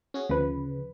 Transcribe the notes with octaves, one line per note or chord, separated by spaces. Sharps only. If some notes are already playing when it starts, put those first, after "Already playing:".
C#4 F#4 G#4
D2 C#3 F3 B4